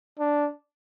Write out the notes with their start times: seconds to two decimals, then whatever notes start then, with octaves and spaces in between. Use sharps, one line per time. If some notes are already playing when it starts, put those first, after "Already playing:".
0.19 D4